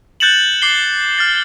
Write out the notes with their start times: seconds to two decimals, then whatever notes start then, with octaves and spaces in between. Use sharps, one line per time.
0.20 F#6 G6 A6 C#7 E7 F#7
0.62 D6 C7 G7
1.18 F6 A6